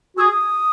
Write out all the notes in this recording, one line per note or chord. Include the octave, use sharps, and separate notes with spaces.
F#4 G#4 D#6 E6